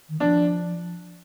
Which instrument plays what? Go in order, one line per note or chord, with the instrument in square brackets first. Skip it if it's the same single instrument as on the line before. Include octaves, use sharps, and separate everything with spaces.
[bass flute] D#3
[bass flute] F3 [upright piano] D4